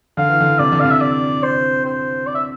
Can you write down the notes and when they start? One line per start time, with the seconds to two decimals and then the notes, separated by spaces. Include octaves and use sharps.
0.17 D3 F5
0.29 E3
0.40 D3
0.59 C3 D5
0.72 D3
0.80 C3 F5
0.90 E5
1.01 D5
1.43 C5
1.85 C5
2.27 D5
2.35 E5